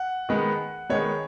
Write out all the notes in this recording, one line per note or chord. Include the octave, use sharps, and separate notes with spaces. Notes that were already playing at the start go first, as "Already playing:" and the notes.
Already playing: F#5
D#3 G#3 B3
D#3 G#3 B3 C#5